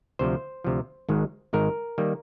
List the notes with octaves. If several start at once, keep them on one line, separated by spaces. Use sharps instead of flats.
D2 C3 F3 C5
D2 C3 F3
G#1 G#2 D#3 G#3
G#1 G#2 D#3 G#3 A#4
D#3 G3 A#3